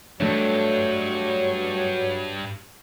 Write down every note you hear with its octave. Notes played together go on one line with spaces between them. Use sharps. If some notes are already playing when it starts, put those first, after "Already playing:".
G2 F#3 A3 D4 C#5